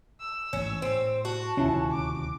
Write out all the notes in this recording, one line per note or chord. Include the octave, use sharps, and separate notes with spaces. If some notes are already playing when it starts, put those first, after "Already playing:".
E6
A1 G#2 C#4
A2 C4
F#4 A5
D#1 D2 C3 C#4 E4 F4
D6